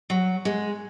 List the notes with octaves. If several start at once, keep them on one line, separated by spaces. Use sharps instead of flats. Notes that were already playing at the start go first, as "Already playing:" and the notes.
F#3
G#3